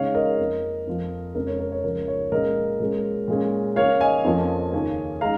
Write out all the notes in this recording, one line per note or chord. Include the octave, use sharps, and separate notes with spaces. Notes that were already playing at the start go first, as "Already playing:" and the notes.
Already playing: C#3 G#3 D#4 C#5 F5
A#4 D#5
F2 F3 A#3
F2 F3 A#3
F2 C#3 F3 G#3 C#4 A#4
C#5
A#4
C#5
C#2 C#3 F3 A#4
C#5
A#2 G#3 C#4 A#4 D#5
A#2 G#3 C#4
A#2 G#3 C#4
C#3 A#3 C#4 C#5 F5
D#5 G#5
F2 F3 A#3 C#4
D#2 C#3 A#3 C#4
G#3 D#4 F5 A#5